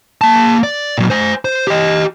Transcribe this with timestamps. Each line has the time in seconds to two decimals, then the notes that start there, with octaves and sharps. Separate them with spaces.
0.21 A#3 A5
0.63 D5
0.98 A#2 F#3
1.10 C5 G#5
1.45 C5
1.67 G4 D#5